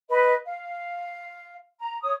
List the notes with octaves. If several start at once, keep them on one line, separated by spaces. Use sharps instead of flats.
B4 D#5
F5
A#5
C#5 D#6